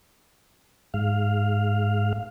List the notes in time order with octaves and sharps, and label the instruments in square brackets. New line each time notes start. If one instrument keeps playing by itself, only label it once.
[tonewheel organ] G#2 F5